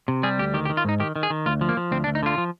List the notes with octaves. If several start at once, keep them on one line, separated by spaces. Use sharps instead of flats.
C3
G3 G#4
D2 G4
D#3 G4
G4
D#3
F4
G#2 D#4
D#3 G4
D#3
G#4
D#3
D2 F4
F3
A#3
F3
D2 C4
D4
D2
D#4
D3 F4
F3